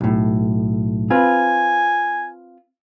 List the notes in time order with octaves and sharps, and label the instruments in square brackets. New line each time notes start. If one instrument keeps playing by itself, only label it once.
[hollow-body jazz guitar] B1 A2
[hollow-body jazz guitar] C4 F4 B4 [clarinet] G#5